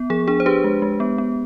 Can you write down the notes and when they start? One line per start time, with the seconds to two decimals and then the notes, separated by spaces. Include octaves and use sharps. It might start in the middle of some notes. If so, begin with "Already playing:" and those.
Already playing: B3
0.10 F3 G#4
0.28 D4 G#4
0.40 C5
0.46 D4 G4 B4
0.64 G#3
0.82 G#3
1.00 B3
1.18 B3